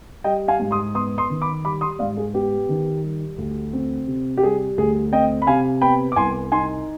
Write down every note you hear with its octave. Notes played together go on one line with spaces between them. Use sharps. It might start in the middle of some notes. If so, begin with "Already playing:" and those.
G3 D#5 G5
F5 G#5
G#2
C6 D#6
B3 C6 D#6
C6 D#6
D#3
B5 D6
G3 B5 D6
C6 D#6
G#2 D5 F5
G#4
B3 G4
D#3
G3
D2
C4
C3
G4
G3 G#4
D2 G#4
C4 D#5 G5
B5
C3 F5 G#5
B3 G5 B5
D6
C2 G#5 C6
D#4 G#5 C6